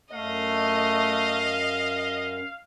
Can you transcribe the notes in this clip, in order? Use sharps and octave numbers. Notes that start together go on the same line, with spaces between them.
F#2 A3 D#5 F5